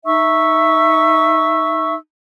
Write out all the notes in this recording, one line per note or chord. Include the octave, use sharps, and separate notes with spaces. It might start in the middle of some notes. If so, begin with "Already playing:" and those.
D#4 E5 C#6 E6